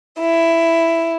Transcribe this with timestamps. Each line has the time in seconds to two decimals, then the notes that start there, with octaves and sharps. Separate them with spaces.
0.20 E4